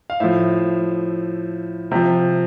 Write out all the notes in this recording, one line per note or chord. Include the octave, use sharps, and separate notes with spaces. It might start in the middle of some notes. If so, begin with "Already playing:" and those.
F5
A2 F3 E5
C3 F3